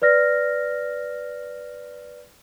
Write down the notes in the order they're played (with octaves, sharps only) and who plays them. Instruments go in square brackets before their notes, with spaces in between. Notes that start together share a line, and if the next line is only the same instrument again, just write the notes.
[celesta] B4 D5 F6 A#6